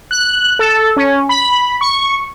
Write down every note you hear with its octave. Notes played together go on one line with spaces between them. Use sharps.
F#6
A4
C#4
B5
C#6